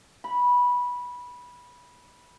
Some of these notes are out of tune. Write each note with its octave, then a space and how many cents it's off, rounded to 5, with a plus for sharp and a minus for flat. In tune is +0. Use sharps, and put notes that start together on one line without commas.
B5 -15